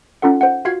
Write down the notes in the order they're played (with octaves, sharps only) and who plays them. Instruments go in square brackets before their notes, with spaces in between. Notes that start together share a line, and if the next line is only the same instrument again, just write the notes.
[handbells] C#4 D#4 F4 A4 F#5
C5 F#5
F4 F#4 F5 G#6 C7